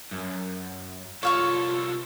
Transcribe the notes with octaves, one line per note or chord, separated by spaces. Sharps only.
F#2
C2 F4 A4 C#5 F5 C#6